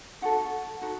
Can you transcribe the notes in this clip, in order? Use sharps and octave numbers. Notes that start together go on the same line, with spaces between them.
D#4 F#4 A4 F#5
D#4 F#4 A4